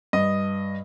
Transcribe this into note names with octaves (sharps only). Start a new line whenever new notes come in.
G2 D#5